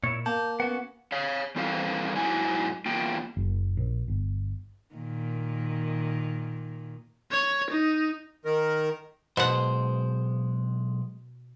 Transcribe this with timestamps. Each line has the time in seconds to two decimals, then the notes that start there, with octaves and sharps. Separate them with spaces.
0.04 A#2 E4 C#5
0.26 A#3 A5 G6
0.60 B3 C#4 F#4 F#5
1.12 C#5 F5
1.56 E3 G3 C4 A4 B4 F5
2.16 G#2 F#3 E4 F#5 G#5
2.86 E2 A#3 F4 G5
3.37 F#1
3.77 A#1
4.08 G1
4.95 A#2 D#3
7.32 C#5
7.70 D#4
8.45 D#3 A#4
9.37 B1 B2 G#3 C5 F#5